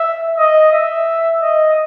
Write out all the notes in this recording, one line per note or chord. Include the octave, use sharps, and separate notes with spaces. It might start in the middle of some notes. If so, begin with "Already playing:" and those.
Already playing: E5
D#5
E5
D#5